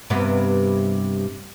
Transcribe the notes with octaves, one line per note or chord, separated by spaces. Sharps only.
G2 C3 B3